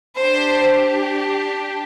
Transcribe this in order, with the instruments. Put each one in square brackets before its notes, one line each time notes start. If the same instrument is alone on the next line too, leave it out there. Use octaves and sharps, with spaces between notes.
[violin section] D4 G4 C5